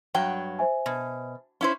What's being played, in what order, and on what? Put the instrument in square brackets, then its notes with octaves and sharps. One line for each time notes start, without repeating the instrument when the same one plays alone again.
[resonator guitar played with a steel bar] G2 F#3 G5
[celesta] C5 E5 G#5
[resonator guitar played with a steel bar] B2
C#4 E4 C5